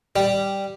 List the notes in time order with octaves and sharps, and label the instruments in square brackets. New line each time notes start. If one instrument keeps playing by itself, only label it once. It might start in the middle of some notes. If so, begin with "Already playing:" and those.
[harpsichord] G3